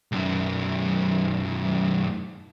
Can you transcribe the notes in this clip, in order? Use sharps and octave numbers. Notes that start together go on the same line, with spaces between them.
B1 F#2